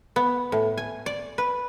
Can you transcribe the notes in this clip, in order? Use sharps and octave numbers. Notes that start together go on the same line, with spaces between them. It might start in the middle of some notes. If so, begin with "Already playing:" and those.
B3
A2
G#5
D5
B4